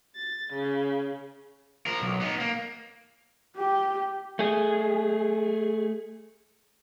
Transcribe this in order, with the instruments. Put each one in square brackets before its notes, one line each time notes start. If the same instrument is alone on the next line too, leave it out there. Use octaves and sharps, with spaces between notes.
[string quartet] A6
C#3
[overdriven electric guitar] F3 A#4
B1
B3 D#4
A#3
[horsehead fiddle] G4
[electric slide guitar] A3 G#4